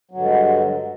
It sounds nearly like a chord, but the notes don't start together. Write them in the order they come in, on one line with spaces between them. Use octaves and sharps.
F#3 G2 D3 G#3